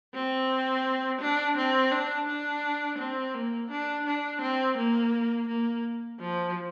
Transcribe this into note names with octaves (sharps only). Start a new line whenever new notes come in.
C4
D4
C4
D4
D4
C4
A#3
D4
D4
C4
A#3
A#3
F3